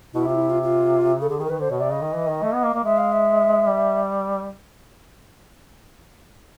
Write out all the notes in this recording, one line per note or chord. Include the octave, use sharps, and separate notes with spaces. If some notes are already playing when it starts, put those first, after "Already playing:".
B2 E4
C3 F4
E4
F4
F4
C#3 A4
D3 G#4
D#3 G#4
A#4
D#3 B4
D3 C5
B2 C#5
C3 D5
C#3 D#5
D#3
E3
D#3
A3
B3
A#3
A#3
G#3 E5
F5
E5
G3